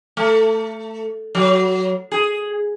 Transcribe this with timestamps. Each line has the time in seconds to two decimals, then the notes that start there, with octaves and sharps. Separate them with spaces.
0.17 A3
1.35 F#3
2.12 G#4